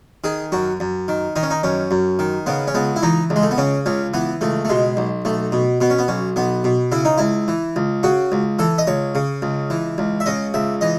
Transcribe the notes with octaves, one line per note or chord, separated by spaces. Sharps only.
D#3 G#4
F#2 F#4
F#2
D#3
D#3 D#4
C#4
D#4
F#2 C#4
F#2
D#3
C#3 B3
C#4
C#2 B3
E4
E3 D#4
C#2
G#3
A3
B3
C#3 C#4
C#2 C#4
E3 B3
C#2 A3
A3
B2 G#3
B1
B1 A3
B2
B2 B3
C#4
B3
B1 C#4
B1 B3
B2
C#3 E4
D#4
C#2 E4
E3
C#2
C#3 F#4
C#2
E3 A4
D#5
C#2 C#5
C#3
C#2
E3
C#2
E5
C#3 D#5
C#2 E5
E3 D#5